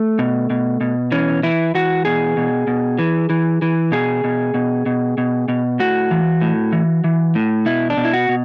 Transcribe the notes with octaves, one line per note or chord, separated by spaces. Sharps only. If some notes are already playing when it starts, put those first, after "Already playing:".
Already playing: A3
B2
B2
B2
E3 C#4
E3 E4
E3 F#4
B2 G#4
B2
B2
E3
E3
E3
B2 G#4
B2
B2
B2
B2
B2
A2 F#4
E3
A2
E3
E3
A2
B2 E4
D4
B2
E4
F#4
B2